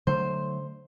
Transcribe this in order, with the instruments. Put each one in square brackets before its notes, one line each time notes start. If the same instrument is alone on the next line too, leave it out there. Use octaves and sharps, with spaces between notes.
[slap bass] D3 F#3 A3 [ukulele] C5